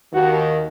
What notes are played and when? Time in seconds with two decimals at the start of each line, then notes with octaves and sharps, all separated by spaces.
0.13 D#2 D#3 F#4